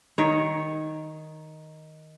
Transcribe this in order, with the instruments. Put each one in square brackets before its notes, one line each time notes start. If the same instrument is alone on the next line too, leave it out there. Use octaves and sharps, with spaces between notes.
[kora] D#3 C#5